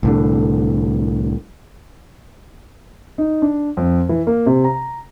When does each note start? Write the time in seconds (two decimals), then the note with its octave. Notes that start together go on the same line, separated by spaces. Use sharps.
0.03 C2 A2 D3
3.18 D#4
3.42 D4
3.77 F2
4.09 E3
4.27 A#3
4.46 C3
4.64 A#5